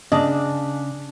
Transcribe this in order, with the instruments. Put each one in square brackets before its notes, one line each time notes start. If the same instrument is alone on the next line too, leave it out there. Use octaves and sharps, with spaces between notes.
[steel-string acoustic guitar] C#3 [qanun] D4 [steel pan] D#5